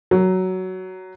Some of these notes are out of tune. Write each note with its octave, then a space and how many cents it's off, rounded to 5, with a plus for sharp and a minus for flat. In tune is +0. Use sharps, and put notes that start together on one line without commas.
F#3 +10